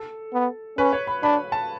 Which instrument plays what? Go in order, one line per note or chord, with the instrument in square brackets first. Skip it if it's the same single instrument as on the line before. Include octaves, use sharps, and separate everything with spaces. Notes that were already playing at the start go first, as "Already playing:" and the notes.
Already playing: [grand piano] A4
[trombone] B3
[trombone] C#4 [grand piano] B4
[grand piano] C#5
B5
[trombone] D4 [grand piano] B5
[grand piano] A5